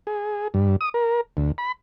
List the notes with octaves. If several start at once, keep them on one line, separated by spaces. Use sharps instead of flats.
G#4
G2
D#6
A#4
D2
B5